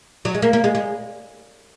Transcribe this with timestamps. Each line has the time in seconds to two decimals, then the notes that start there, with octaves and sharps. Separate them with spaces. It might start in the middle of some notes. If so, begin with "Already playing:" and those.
0.25 F#3
0.35 G#3
0.42 A#3
0.53 A#3
0.64 G#3
0.75 G#3